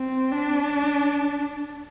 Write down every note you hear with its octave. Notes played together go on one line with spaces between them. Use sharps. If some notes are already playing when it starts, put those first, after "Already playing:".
Already playing: C4
D4